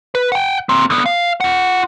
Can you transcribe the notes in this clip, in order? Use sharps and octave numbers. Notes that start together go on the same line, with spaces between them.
B4
F#5 G5
A#3 C4
D3 B3
F5
F4 F#5